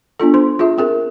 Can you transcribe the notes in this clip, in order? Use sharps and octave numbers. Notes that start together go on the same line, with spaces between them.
B3 D4 F4 A4
C5 C6
F4 G#4 E5
C4 G#4 A#4